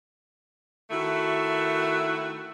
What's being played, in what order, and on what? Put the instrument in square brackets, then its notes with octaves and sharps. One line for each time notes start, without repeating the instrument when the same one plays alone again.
[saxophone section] D#3 A3 E4 F#4